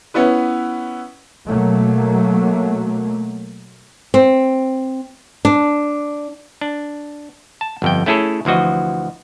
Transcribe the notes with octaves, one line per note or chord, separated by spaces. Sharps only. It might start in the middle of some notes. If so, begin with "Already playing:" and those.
B3 C#4 E4 B4
B2 F#3 A3 A#3
C4
D4
D4
A5
G1 F2 G5
A3 C#4 E4 G#4 A4 C#5
D2 E3 F3 F#4 D#5